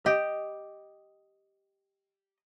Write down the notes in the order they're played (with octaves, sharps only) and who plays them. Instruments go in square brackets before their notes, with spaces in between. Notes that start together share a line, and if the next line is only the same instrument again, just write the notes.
[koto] G4 [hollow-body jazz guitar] D#5